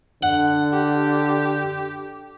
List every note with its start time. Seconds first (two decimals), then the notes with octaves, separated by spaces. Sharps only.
0.23 D3 F#5
0.74 G4